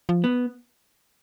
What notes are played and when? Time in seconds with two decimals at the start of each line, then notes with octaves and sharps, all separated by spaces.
0.09 F3
0.24 B3